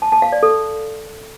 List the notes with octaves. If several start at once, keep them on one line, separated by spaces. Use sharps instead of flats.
A5
A5
F5
D5
A4